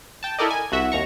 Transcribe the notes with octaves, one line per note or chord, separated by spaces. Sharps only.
G5 A5
E4 A4 A#4 D5 D#5
G#5
C2 F#4 E5
D#2 A#5 C#6